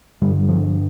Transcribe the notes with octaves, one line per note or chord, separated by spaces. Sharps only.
G2 D3 G3
F3